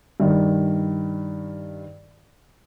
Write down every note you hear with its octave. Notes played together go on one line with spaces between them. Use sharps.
G2 D#3